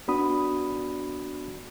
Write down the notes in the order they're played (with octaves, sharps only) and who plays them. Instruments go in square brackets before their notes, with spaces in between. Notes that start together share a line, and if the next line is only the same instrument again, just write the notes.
[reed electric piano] B3 D4 F#4 B5 D#6